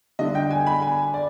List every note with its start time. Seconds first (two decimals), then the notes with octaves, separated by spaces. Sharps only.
0.19 D3 G3 D4 D#5
0.35 G5
0.51 G#5
0.66 B5
0.82 G#5
1.14 D5